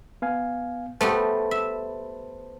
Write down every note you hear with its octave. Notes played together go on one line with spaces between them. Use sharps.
B3 F5 G#5
A3 B3 G4 B4 C5 A5
E5